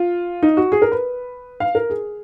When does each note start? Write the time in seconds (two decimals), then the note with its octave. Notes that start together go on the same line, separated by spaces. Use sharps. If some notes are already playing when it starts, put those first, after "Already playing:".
Already playing: F4
0.43 D#4
0.57 F#4
0.72 G#4
0.82 A#4
0.92 B4
1.60 F5
1.75 A#4
1.90 G#4